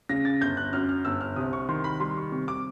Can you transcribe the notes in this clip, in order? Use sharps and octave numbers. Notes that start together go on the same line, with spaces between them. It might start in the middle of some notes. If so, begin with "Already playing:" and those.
C#3 A#6
A6
G1 G6
F#6
F#2 F6
F6
G1 E6
F6
C2 D#6
C#6
D#3 C6
B5
G3 C6
C#6
C3 C#6
D6